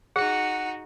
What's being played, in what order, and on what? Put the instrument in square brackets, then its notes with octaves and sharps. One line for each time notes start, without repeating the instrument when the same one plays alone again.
[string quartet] D#4 F#4 [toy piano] G#4 [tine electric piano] F#5 C#7